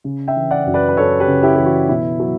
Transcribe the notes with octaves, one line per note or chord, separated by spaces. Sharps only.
C#3
E5 G5
E3
D5 F#5
F#2
B4 D5
B4
F#2 A4 C#5
G4 B4
C#3
E4 G4
E3 G4
F#4
B2 E4
F#3